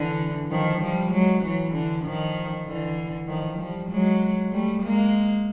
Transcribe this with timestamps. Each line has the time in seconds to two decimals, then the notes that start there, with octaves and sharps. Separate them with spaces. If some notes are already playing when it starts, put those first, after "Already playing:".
Already playing: D3 E3
0.51 D#3 F3
0.81 F3 G3
1.12 F#3 G#3
1.43 E3 F#3
1.73 D3 E3
2.04 D#3 F3
2.67 D3 E3
3.28 D#3 F3
3.59 F3 G3
3.90 F#3 G#3
4.52 G3 A3
4.82 G#3 A#3